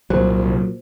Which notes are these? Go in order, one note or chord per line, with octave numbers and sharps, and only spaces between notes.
C2 A#2 F#3 C5